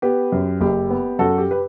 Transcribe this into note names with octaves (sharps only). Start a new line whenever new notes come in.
B3 G4 B4
F#2
F#1 G4
B3
F#2 F#4 A4
G4
B4